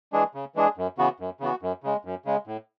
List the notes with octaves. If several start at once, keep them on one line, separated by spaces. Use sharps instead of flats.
E3 G#3 D4 G#4
C#3
E3 G#3 D4 G#4
F#2
C#3 E3 B3 F#4
F#2
C#3 E3 B3 F#4
F#2
C#3 G#3
F#2
C#3 G#3
A2